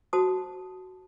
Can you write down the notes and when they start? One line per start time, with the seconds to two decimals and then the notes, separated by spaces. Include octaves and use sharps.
0.13 F#4 C5 A5 D#6